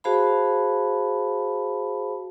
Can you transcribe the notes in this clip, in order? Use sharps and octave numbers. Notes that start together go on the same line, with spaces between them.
F#4 G#4 C5 F5 A5 B5